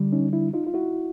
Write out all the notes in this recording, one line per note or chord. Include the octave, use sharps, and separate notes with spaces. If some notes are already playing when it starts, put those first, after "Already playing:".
Already playing: D3 G3
C#4 D#4
D4 E4
D#4 F4
F4
E4 F#4